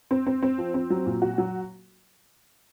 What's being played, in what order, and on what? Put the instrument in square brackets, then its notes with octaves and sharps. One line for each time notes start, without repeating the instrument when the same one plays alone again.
[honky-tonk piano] C4
C4
C4
F3
C4
F#3
A#2
F#4
F#3